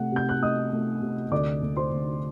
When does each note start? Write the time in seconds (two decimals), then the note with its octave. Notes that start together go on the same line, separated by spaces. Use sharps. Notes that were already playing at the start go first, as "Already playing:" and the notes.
Already playing: C3 A3 F#5
0.12 C3 G6
0.29 F#6
0.42 A3 D#5 D#6
0.73 A3
1.02 C3
1.31 D2 D5 D6
1.63 D2
1.77 C5 C6
1.92 D2